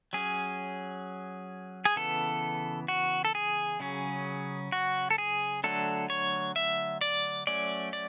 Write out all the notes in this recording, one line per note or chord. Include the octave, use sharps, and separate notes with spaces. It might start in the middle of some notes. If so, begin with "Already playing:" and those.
F#3 C#4 G#4
G#4
C#3 E3 B3 A4
F#4
A4
G#4
C#3 F#3 C#4
F#4
A4
G#4
D3 F#3 A3 D4 A4
C#5
E5
D5
F#3 A3 C#4 D5
D5